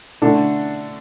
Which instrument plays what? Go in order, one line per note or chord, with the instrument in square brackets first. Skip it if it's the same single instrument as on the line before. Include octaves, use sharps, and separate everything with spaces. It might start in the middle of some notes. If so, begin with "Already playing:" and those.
[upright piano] D3 A3 D4 A4